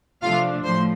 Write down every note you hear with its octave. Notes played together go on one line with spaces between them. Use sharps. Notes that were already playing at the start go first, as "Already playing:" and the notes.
C3 F3 A3 D4 F4 F5
A2 F3 C5 C6